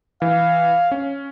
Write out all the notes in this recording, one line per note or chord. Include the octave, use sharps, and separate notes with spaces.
E3 F5
C#4